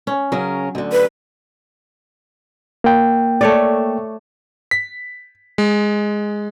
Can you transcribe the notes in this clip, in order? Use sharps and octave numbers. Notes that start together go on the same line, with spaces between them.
C#4
C#3 F#3 C#4 A#4
D2 D3
B4
A#3 G5
A3 C#5 D5
B6
G#3